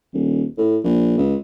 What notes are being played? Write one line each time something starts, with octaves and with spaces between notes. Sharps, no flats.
D#1
A2
A#1
C#2